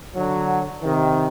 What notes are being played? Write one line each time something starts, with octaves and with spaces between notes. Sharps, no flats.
D3 F#3
C3 D#3